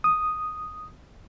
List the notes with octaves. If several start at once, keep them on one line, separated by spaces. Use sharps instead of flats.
D#6